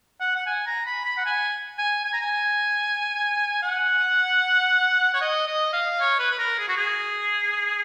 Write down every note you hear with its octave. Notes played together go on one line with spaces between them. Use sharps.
F#5
F#5
G#5
A#5
B5
B5
F#5
G#5
G#5
G#5
A#5
G#5
F#5
C#5
D#5
D#5
F5
C#5
B4
B4
A#4
G#4
F#4
G#4